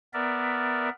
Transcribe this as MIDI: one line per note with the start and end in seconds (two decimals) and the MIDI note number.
0.14 0.89 59
0.14 0.89 70
0.14 0.89 74
0.14 0.89 76